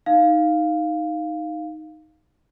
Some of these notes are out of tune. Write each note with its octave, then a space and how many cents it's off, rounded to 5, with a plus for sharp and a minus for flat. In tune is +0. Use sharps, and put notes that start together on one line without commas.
D#4 +0 F5 +0